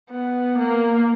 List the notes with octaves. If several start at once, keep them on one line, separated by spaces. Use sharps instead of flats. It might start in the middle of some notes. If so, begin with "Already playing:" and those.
B3
A#3